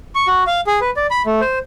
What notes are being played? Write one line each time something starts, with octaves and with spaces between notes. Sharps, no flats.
C#6
F#4
F5
G#4
B4
D5
B5
A3
C5